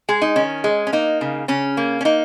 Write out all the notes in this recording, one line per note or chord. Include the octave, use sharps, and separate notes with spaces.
G#3 G#4
D#4
D#3 C#4
G#3
C#4
A#3 D#4
C#3
C#3 C#4
A#3
C#4
A#3 D#4